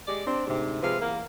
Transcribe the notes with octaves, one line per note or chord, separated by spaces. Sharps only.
G#3 G4 D5
C4 D4
D2 G#2 C3
C3 F3 G#3 B4 F5
E2 A#3